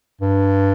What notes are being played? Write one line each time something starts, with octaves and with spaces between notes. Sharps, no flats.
G2